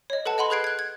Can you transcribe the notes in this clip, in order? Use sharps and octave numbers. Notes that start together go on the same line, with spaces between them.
C#5 D#5
A4 B4 F#5 A5
D#5 F#5 B5 C6
G#4 B4 F#6 G#6 C7 D7
F#6 G#6
G#6